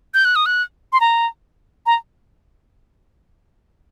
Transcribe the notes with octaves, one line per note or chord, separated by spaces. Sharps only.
G6
F#6
D#6
F#6
C6
A#5
A#5